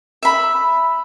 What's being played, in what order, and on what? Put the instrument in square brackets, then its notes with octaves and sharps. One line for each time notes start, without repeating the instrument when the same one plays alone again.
[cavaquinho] E5 B5